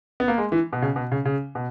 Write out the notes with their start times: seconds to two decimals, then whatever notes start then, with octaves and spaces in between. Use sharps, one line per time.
0.20 B3
0.28 A#3
0.38 G#3
0.52 E3
0.73 B2
0.82 C#3
0.96 B2
1.12 C#3
1.25 C#3
1.55 B2